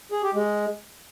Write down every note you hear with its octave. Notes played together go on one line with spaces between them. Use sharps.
G#4
G4
G#3